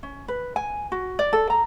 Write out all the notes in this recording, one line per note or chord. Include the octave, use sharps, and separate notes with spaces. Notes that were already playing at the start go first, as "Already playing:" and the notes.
C#4
B4
G#5
F#4
D5
A4
A#5